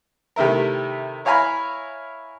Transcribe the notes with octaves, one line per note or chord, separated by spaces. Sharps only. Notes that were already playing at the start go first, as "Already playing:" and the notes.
C3 D#3 A3 E4 A#4
E4 C#5 F5 G#5 A#5 B5